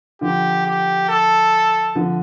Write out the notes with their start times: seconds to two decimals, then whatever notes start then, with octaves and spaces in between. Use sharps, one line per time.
0.21 D3 F3 G4
0.66 G4
1.09 A4
1.95 D3 F3